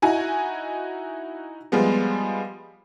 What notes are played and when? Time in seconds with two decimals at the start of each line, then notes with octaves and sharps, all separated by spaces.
0.02 D#4 E4 F#4 G#5
1.72 F3 G3 G#3 B3